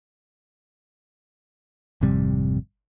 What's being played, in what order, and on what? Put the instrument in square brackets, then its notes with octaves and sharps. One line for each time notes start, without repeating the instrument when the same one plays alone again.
[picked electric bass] G#1 F2 C3 G3